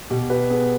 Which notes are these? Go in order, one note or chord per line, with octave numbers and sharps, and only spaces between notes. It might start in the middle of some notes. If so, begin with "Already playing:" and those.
B2 G4
G4 B4
B3 G#4